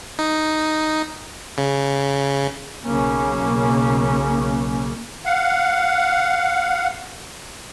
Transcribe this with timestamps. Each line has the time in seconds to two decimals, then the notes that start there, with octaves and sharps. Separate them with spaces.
0.19 D#4
1.58 C#3
2.84 B1 C#3 A#3 C#4
5.25 F5 F#5